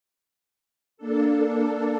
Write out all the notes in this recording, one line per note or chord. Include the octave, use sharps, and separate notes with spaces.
A#3 D4 A4